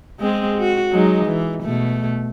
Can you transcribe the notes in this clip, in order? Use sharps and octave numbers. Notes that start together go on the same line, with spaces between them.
G#3 C4 G#4
F#4
F#3 G#3 D#4
E3
B2 A3